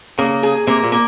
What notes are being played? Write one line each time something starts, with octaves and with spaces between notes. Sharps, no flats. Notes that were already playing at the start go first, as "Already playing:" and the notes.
C#3 A#3
G#4
C3 A#3
A#2
A#3